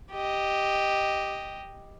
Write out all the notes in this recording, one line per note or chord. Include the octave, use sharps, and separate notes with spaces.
G4 D#5